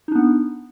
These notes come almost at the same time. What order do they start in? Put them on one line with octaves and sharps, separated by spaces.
D#4 D4 B3